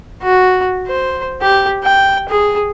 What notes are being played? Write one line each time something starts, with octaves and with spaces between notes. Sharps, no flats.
F#4
C5
G4
G5
G#4